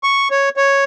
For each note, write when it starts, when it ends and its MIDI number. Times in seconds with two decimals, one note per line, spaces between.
0.03 0.28 85
0.31 0.49 73
0.57 0.84 73